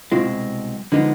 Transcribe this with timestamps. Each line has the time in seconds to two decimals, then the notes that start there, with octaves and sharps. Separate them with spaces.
0.12 C2 B2 G#3 C4 F4
0.92 D3 F3 G#3 B3 D#4